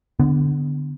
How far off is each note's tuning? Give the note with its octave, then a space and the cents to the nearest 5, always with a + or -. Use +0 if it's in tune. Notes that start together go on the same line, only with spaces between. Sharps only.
D3 +0 B3 +15